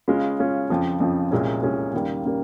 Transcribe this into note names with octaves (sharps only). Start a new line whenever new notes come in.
C#3 G#3 C#4 F4
C#3 G#3 C#4 F4
F2 C#3 F3
F2 C#3 F3
C2 A#2 G#3 C#4
C2 A#2 G#3 C#4
D#2 C#3 G3 A#3
C#3 G3 A#3